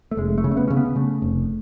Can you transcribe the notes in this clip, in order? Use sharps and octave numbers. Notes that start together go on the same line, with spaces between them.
A3
F1 G#3
A3
C#3
A3
B3
C#3 C#4
B3
C#3 A3
F1